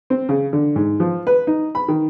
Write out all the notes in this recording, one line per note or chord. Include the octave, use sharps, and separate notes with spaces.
C4
C#3
D3
G#2
F3
B4
D#4
B5
D#3